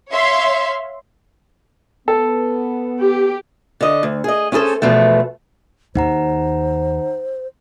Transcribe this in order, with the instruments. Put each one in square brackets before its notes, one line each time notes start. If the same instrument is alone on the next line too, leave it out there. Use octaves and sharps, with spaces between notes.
[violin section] C#5 E5 F5 C6
[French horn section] B3 [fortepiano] A4
[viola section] G4
[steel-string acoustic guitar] D3 D#5
D2
G#4 D#5
C#4 E4 G#4 A4 C5
E2 B2 F3 A3
[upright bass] D#2 [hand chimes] D#4 F#5 A#5 [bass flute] C5